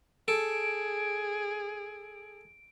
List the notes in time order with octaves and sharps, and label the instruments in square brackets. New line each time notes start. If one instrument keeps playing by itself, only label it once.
[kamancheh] G#4 [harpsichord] A4 [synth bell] D7